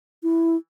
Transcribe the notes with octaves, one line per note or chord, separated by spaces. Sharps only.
E4